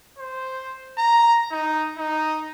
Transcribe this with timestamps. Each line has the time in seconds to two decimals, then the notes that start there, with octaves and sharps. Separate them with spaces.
0.18 C5
0.98 A#5
1.51 D#4
1.98 D#4